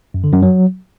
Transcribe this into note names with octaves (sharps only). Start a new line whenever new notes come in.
F#2
D3
F#2
F#3